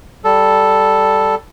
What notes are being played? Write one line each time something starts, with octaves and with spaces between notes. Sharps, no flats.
G3 A4